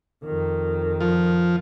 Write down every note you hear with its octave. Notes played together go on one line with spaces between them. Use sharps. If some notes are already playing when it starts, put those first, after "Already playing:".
F2 D#3
F3